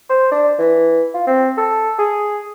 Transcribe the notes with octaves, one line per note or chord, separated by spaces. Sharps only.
C5
D4
E3
F4
C4
A4
G#4